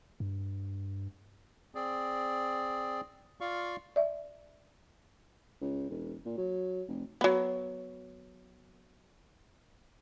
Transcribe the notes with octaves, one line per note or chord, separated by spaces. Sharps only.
G2
C4 G#4 D5
F4 D5 F5 C#6
D5 E5
C#2
E1
A#2
F#3
F1
F#3 B3